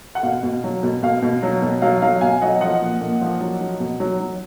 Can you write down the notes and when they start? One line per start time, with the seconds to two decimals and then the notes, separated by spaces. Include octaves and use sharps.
0.15 F#5
0.23 B2 F5
0.43 B2
0.64 F#3
0.83 B2
1.03 B2 F5
1.22 B2
1.43 F#3
1.62 B2
1.82 F#3 F5
2.02 F#3 F5
2.21 B2 F5 G#5
2.41 F#3 D#5 F#5
2.61 F3 D#5 F#5
2.82 A#2
3.01 A#2
3.21 F3
3.41 F#3
3.61 F#3
3.80 B2
4.00 F#3
4.20 F#3